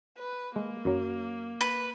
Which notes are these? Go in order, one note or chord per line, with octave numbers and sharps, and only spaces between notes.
B4
G#3 A#3
F#2 F#3
B4